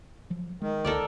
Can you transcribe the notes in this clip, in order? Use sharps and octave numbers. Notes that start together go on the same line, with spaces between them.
F3 F#3
D#3 G#3
C#2 D3 A4 A#4 D5